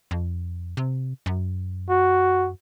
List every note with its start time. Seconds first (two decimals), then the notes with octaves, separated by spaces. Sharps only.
0.11 F2
0.77 C3
1.26 F#2
1.90 F#4